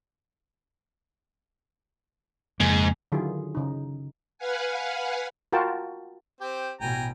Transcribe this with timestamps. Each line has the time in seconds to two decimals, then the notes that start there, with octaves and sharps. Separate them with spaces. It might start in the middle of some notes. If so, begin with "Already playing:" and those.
2.60 F2 G#2 C#3 A#3
3.12 D3 D#3 F#3 E4 F4 G#4
3.55 C#3 D#4
4.38 B4 F5 F#5 G#5
5.53 F4 F#4 A#4 G5 A5
6.41 C4 G4
6.81 A1 B2 B3 G5 G#5 A#5